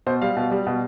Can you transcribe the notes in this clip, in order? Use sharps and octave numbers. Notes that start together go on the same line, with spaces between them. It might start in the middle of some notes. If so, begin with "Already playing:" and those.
B2 C5
G3 F5
B2
G3
B2